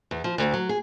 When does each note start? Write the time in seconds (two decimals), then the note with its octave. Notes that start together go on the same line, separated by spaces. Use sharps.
0.11 E2
0.24 F3
0.38 D2
0.53 F#3
0.69 G#4